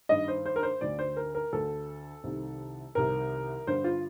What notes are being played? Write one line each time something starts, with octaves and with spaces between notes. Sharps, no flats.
G2 D#3 D#5
C5
C5
A#4
C5
D2 D3 D5
C5
A#4
A#4
D2 D3 A4
C2 C3 D#3
C2 C3 D#3 A#4
G2 D3 C5
F4